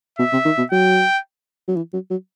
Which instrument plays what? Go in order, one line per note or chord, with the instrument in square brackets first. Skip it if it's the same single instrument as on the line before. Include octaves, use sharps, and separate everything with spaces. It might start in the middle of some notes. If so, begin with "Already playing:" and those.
[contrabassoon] B2 [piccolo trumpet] E5
[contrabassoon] C3
D#3
B2
[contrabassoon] F#3 [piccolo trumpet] G5
[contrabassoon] F#3
E3
F#3
F#3